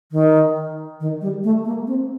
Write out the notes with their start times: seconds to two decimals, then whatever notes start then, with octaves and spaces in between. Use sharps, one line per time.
0.12 D#3
1.00 D#3
1.21 G3
1.44 A3
1.65 A#3
1.87 C4